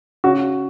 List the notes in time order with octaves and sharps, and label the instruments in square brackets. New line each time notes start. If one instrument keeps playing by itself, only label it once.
[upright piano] C#3 F#4